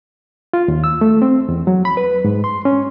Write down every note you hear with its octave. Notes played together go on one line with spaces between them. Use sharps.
F4
D#2
E6
A3
C4
E2
F#3
B5
B4
G#2
C6
C#4